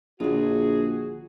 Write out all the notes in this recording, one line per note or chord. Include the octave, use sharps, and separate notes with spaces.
A#1 D3 F4 F#4 G#4